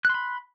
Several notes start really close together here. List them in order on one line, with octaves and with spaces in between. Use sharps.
F#6 C6 B5